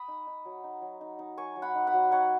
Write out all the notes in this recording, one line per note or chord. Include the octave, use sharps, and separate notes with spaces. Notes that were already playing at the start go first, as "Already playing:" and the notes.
Already playing: B5 D#6
D#4
D#4
F#3
D#4
F#3
D#4
D#4
F#3 G#5 C#6
F#3
F#5 B5
D#4
F#5 B5
F#3
D#4 C#5 F#5